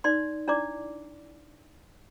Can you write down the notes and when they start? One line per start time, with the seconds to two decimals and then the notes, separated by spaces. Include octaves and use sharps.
0.04 D#4 D5 C6
0.48 D4 E4 D5 D6